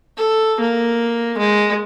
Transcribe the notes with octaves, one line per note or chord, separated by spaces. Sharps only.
A4
A#3
G#3